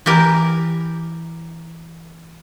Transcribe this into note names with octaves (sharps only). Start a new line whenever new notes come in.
E3 G4 A#4